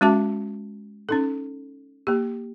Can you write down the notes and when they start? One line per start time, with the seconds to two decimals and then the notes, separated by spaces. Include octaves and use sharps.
0.01 G#3 C#4 F#4 E5 A5
1.09 C#4 D#4 A4
2.07 A#3 G4